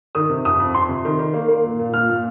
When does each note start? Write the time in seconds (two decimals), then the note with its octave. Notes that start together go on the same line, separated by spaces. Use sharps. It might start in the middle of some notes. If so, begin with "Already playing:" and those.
0.15 D#3 D#6
0.30 C3
0.45 F2 D#6
0.60 F2
0.75 F2 C6
0.89 C3
1.05 D#3
1.19 D#3
1.34 A#3
1.48 A#3
1.64 A#2
1.80 A#2
1.94 A#2 F6
2.09 A#2